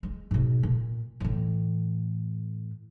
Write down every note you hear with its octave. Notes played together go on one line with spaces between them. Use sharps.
G#3
G#2 B2
A#2
A2 E3